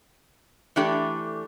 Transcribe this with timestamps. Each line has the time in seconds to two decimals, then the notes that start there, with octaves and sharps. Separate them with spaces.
0.76 E3 A3 D4 G4 A4